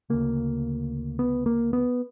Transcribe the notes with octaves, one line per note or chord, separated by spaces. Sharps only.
D2 C#3 A#3
B3
A#3
B3